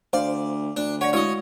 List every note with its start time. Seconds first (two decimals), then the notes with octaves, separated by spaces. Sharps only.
0.13 D2 C5 D5 F5
0.77 D2 D4
1.01 C#5 D5 F#5 C#6
1.13 G#3 E4 F#4 C#5 D#5